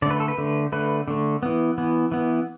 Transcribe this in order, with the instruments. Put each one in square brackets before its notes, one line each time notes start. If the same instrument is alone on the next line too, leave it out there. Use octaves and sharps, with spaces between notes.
[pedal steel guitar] D3 D5
A3 B4
A4
B4
D3 A3
D3 A3 B4
D3 A3
E3 B3
E3 B3
E3 B3